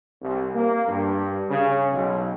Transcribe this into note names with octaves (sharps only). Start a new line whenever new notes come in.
C2
A#3
G2
C#3
B1